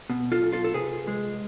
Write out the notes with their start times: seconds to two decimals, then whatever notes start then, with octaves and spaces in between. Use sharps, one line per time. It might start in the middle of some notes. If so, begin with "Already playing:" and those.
0.10 B2
0.32 F4 A4
0.42 B1
0.52 F4 A4
0.64 A4
0.74 C3 G#4 B4
1.07 G#3